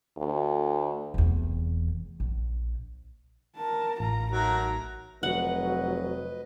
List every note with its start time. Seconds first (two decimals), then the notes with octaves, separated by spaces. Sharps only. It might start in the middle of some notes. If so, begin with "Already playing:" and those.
0.17 D2
1.14 F1 E2
2.20 A#1
3.56 A#4 A5
4.00 A1 F4 A#5
4.31 F#3 A3 D#4 A#4 A#5
5.23 F1 F#3 B4 D#5 F#5